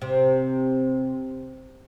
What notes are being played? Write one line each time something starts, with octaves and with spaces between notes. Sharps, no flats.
C3